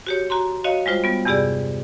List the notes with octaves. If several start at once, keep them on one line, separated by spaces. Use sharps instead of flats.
F#4 G4 C#5
F#4 A#5 C6
F#4 C#5 D#5 F5
G3 G#3 F4 C5
G3 B3
E2 G2 C3 G4 G#4 D5